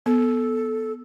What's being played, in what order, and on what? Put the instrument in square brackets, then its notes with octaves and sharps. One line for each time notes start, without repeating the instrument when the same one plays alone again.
[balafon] B3 [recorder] A4